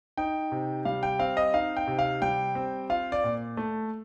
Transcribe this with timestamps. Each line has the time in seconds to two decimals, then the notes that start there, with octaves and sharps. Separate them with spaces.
0.17 D#4 G5
0.52 C3
0.85 G3 F5
1.03 G5
1.19 C4 F5
1.37 D#5
1.54 D#4 F5
1.77 G5
1.87 C3
1.99 F5
2.22 G3 G5
2.55 C4
2.90 F4 F5
3.12 D5
3.24 A#2
3.57 A3